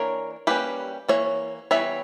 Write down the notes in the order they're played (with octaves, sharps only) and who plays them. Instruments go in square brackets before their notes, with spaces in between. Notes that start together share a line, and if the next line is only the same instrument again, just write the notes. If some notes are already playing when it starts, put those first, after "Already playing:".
Already playing: [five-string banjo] E3 A#3 D4 A#4 C#5
G3 A#3 C#4 G4 B4
E3 A#3 C#5
E3 G3 B3 C#5 E5